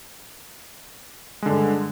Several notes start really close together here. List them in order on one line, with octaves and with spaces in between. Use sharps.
G#3 D3 G2